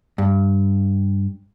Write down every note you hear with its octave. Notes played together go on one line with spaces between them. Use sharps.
G2